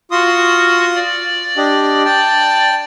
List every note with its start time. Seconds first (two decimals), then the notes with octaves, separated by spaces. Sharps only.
0.11 F4 F#4 C6 D#6
0.95 D5
1.57 D4 G4 D#5
2.05 G5 A5